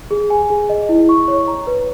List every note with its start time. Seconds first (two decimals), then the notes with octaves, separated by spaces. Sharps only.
0.11 G#4
0.30 G#5
0.50 G#4
0.69 D#5
0.89 E4
1.09 C#6
1.28 C#5
1.48 A#5
1.67 B4